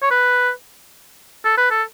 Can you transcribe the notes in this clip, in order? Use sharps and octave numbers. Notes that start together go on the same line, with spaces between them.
C#5
B4
A4
B4
A4